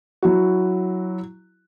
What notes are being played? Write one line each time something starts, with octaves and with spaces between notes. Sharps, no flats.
F#3 E4 F#4